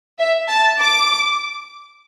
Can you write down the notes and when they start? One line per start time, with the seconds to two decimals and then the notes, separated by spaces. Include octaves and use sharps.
0.18 E5
0.49 A5
0.80 D6